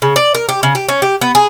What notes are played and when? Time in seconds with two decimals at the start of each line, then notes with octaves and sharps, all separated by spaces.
0.02 C#3
0.16 D5
0.34 A#4
0.49 G4
0.63 C#3
0.75 G4
0.89 C#4
1.02 G4
1.21 B3
1.35 G#4